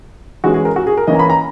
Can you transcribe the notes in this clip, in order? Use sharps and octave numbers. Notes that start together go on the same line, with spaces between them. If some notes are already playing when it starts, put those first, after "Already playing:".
E3 G#3 C#4 F#4
G#4
A#4
F#4
G#4
A#4
E3 A#3 C#4 D#5
A#5
B5
A#5